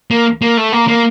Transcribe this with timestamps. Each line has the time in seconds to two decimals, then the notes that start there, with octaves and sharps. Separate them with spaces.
0.11 A#3
0.42 A#3
0.57 A3
0.72 A#3
0.88 A#3